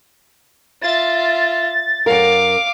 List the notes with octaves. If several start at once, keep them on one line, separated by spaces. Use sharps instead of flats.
F4 E5 A6
F#2 A#2 A#4 F5 D6